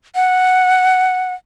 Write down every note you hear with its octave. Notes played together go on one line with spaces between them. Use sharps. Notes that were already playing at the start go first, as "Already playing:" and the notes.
F#5